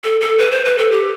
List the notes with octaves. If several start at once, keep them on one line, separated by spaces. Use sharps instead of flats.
A4
A4
B4
C5
B4
A4
G4